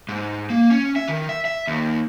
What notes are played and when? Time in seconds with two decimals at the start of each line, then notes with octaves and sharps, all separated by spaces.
0.09 G#2
0.50 A#3
0.70 C#4
0.96 E5
1.07 D#3
1.29 E5
1.45 E5
1.67 D#2